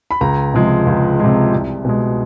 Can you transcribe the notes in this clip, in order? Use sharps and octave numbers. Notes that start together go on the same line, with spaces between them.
B5
C#2 A#5
C3 F3 G#3
C#2
C3 F3 G#3
C2
B2 G#3